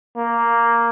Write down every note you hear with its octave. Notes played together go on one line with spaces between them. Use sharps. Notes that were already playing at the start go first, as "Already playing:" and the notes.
A#3